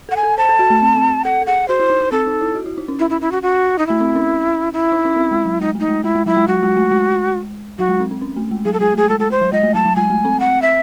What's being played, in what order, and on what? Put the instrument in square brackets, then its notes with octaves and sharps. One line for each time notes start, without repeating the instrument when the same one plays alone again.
[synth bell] A4 [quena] F#5
[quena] G#5
[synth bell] A4
[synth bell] C5 [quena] A5
[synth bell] A4
F#4
A3
C4
C4
[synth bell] A4 [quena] F#5
[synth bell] A4
[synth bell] G#4 [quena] F#5
[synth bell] F#4 [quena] C5
[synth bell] E4
D#4
D#4
[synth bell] C4 [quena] A4
[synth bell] D#4
E4
F#4
E4
D#4
C#4
[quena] E4
E4
E4
F#4
F#4
D#4
[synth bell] A3 [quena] E4
[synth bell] C4
C#4
[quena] E4
[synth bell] D#4
C#4
C4
G#3
F#3
[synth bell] G#3 [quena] D#4
[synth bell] A3 [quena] D#4
[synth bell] G#3
[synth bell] G#3 [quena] E4
[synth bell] G#3
[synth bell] F#3 [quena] E4
[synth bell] G#3
[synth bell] F#3 [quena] F#4
[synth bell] G#3
A3
G#3
[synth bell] F#3 [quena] F#4
[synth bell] G#3
C4
C4
C#4
A3
G#3
[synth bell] F#3 [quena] G#4
[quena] A4
[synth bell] G#3 [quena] G#4
[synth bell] A3 [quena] G#4
[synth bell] G#3 [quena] A4
[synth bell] G#3 [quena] A4
[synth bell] G#3 [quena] C5
[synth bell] F#3
[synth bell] G#3 [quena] D#5
[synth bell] A3
[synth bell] F#3 [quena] A5
[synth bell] F#3
[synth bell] G#3 [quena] G#5
[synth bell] A3
C4
[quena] F#5
E5